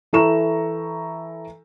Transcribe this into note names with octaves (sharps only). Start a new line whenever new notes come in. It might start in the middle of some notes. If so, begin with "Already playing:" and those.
E3 E4 A4 A#5 C#6 E7